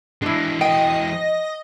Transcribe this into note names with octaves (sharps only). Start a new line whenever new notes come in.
E3 G#3 D4 E4
D#5 G5